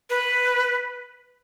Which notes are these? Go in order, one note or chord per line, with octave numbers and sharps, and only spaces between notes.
B4